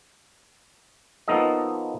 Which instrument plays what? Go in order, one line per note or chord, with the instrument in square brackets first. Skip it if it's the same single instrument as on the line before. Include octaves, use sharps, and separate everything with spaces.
[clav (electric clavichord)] F3 A#3 B3 D#4 A4 D#5